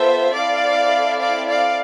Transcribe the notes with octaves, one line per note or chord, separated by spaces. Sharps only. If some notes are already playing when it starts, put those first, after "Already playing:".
Already playing: B3 F4 A4 C5 E5
C4 E4 A4 D5 F5
D5 F5
D5 F5